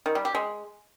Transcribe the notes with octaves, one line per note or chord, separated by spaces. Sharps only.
D#3
G3
G4
G#3